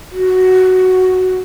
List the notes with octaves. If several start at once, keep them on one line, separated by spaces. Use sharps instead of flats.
F#4